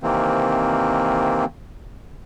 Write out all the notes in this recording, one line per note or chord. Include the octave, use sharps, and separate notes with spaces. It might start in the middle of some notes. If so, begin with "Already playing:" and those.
C3 D#3 E3 A#3 C4